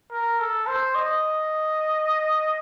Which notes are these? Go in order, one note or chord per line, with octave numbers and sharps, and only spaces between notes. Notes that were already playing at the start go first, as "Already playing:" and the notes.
A#4
A4
C5
D#5